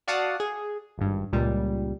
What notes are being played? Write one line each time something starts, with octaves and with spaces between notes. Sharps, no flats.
F#4 D5 F5 F#5 A5 D#6
G#4
G#1 G2
C#2 A#2 G3